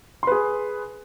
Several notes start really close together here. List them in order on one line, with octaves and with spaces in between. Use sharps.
C6 B4 G#4